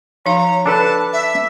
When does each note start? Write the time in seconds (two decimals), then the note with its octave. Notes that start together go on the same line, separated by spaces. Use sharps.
0.26 F3 D#4 F5 A#5
0.66 D4 A4 B4 A5
1.13 E5